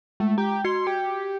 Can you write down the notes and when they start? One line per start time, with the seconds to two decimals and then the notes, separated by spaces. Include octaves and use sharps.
0.20 G#3 A3
0.38 G4 A#5
0.65 F#4 C6 G#6 C#7
0.87 G4